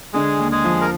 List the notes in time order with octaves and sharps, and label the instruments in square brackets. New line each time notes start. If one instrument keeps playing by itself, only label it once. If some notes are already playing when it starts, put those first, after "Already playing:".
[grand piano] D3 [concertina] G#3 G#4
[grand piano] D#2
[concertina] G#3 G#4
[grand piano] F3
[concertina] A#4